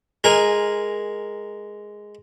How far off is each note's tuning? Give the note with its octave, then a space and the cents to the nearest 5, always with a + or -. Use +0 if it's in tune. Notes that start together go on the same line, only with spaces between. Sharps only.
G#3 +0 A#4 +0 G#5 -15